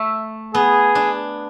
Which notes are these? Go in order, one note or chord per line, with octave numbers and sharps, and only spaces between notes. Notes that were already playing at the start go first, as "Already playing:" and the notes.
Already playing: A3 E5
B3 G#4
D4